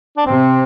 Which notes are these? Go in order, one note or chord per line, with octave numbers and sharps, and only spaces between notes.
D4
C3 C4